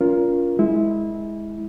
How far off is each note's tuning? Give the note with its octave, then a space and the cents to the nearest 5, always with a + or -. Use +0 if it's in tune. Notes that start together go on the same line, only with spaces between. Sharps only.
C#4 +35 F4 -5 A#4 +10
G#3 +0 E4 -20